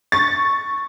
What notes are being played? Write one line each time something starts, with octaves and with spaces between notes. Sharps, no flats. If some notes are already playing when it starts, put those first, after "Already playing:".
C#6 A6